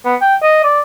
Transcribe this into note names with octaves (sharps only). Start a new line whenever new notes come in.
B3
G5
D#5
D5